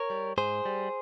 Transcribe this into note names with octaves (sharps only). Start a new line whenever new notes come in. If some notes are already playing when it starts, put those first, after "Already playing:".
Already playing: A#4 C#5
G3
G#2 G#4 C5
G3